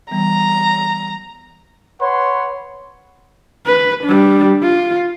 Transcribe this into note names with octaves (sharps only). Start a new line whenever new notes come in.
E3 G3 B3 A#5
B4 C#5 F#5 C6
B4
G3 D4
F4